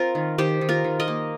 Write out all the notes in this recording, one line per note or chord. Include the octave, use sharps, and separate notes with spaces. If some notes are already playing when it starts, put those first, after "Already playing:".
Already playing: C4 F4 A#4
D#3
D#3 G4 C5
D#3
F4 A#4
D#3
A#4 D#5
A#3